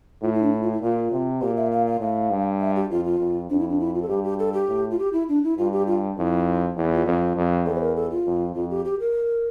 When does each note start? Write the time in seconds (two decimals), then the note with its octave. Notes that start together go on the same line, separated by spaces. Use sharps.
0.22 A2 F4
0.33 E4
0.42 D4
0.52 E4
0.62 F4
0.72 E4
0.81 A#2 F4
1.12 C3
1.41 A#2 G4
1.57 E5
1.72 F5
1.87 F5
2.00 A2 F5
2.30 G2
2.60 E5
2.76 G4
2.91 F2 F4
3.05 F4
3.19 F2
3.50 F2 D4
3.59 E4
3.69 D4
3.80 E4
3.95 F4
4.02 A4
4.09 G2 G4
4.24 G4
4.39 A4
4.53 G4
4.68 A2
4.91 F4
4.99 G4
5.13 E4
5.29 D4
5.44 E4
5.58 G2 F4
5.72 G4
5.87 F4
6.17 F2 E4
6.77 E2 E4
6.91 F4
7.06 F2
7.36 F2
7.66 E2 A4
7.75 C5
7.82 A#4
7.96 A4
8.11 F4
8.26 F2
8.55 F2 F4
8.70 G4
8.85 G4
9.00 A#4